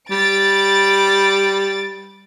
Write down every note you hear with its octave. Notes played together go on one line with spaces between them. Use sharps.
G3 A6 D7